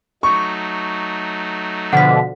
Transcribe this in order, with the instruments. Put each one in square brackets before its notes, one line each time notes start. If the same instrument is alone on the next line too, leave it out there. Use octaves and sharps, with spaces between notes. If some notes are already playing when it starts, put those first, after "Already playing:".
[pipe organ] F#3 A3 D#4 [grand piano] C#6
[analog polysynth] B2 D3 F3 [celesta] F#5 B6